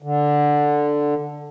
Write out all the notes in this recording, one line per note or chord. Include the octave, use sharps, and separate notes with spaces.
D3